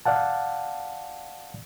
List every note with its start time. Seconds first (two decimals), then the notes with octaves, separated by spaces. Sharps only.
0.05 D5 F5 F#5 A5